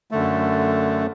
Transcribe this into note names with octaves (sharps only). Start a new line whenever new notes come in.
F#2 D3 A3